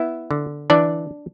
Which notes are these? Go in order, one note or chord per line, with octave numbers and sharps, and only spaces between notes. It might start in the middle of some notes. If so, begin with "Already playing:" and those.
Already playing: B3 E4 E5
D3
E3 D4 D5